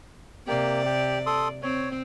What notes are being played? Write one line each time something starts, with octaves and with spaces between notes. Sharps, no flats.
C3 A#3 G4 D5
G4
A4 C6 D#6
C4 C#5